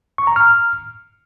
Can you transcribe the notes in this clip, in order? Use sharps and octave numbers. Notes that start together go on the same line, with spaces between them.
C#6
A#5
F6